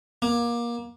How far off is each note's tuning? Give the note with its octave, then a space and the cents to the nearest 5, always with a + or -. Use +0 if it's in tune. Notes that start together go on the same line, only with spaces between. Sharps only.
A#3 +25